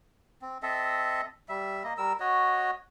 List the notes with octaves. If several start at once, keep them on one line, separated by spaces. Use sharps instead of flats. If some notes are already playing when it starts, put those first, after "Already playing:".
C4
C4 A4 D#5 E5
G3 E5
A#3 D#5
G3 A#4 E6
F#4 C#5 D#5